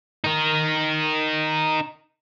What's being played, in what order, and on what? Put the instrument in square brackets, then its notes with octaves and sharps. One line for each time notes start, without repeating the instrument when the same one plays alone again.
[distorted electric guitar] D#4 A#4